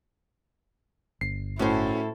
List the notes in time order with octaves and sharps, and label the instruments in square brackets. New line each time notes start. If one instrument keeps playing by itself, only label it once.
[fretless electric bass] G1 [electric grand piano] C7
[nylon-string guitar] A2 C5 [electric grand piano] C#4 F#4 [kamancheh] E4 A4